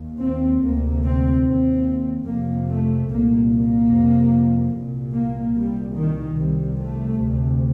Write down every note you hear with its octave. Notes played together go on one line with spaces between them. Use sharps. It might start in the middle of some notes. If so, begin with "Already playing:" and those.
Already playing: D#2
C4
D2 C3 A#3
C4
D#2 C4
F2 C3 A#3
A3
C2 A#2 A#3
A#3
F2 C3
C2 A#2
A#3
C2 A#2 G3
D#3
C2 C3 G3
A3
D2 C3